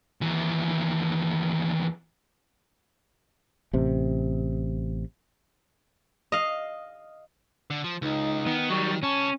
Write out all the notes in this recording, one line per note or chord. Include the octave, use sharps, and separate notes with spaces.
D#2 E3
A1 C3
D#5 F5
D3
F3
C#2 D#4
D#3 B3
F#3 G3 C#6
C2 C#4 A5 C#6